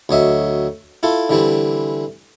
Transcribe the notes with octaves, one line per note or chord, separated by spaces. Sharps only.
D2 F#3 D#5 E5
E4 F4 A4
D3 E3 G3 C4